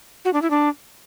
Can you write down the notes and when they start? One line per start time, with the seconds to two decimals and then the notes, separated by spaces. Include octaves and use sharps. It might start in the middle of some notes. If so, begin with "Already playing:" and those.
0.25 F#4
0.33 D4
0.42 E4
0.50 D4